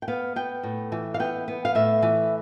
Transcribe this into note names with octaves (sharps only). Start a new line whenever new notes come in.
G5
B3 F5
B3 G5
A2
E3
F5
B3 G5
B3
F5
A2 E5
E3